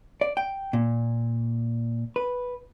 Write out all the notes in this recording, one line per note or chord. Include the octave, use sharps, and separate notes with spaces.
D5
G5
A#2
B4